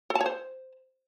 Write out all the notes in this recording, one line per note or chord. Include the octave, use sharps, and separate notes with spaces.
A4
A5
C#5
C5